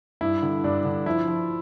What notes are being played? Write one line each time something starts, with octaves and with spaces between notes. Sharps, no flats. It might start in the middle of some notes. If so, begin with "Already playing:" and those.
G2 E4
D3
G2 D4
D3
F3 E4
F3